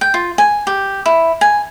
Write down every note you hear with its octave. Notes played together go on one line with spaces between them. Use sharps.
G5
F4
G#5
G4
E4
G#5